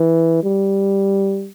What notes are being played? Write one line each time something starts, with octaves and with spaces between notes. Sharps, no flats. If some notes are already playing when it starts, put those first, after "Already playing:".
Already playing: E3
G3